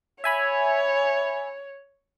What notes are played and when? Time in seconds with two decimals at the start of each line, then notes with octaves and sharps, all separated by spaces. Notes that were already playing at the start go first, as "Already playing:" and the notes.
0.24 C#5 E5 G#5 B5